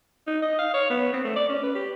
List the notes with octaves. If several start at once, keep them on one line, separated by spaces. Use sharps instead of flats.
D#4
D#5
F5
C#5
B3
C4
A3
D5
C#4
B4
G4